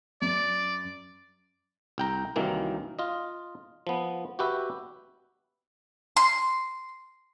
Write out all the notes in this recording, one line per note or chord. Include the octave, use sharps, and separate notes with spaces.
F#2 D5
C2 G5 A#5
C2 F#2 D#3 E3 A#3
F4 D#5
F3 B3
F#4 G4 B4 E5
C6